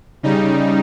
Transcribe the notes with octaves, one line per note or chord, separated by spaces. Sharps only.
C#3 G3 D#4